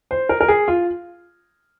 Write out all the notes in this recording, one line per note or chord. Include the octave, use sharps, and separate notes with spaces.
C5
A#4
A#4
G#4
F4